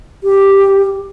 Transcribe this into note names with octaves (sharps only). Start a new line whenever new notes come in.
G4